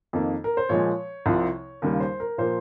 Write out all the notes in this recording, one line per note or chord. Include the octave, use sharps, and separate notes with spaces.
F2 D#3 A#3
A#4
C5
A#2 F3 G#3 C#5
C2 C3 F3
D#2 C#3 G3 A#3 A#4
C5
A#4
A#2 F3 A#3 C5